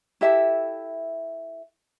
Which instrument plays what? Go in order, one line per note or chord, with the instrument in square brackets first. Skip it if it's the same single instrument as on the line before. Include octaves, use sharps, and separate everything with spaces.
[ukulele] E4 G4 A4 E5